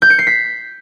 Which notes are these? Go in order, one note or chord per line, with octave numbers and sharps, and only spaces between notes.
G6
C#7
C7
B6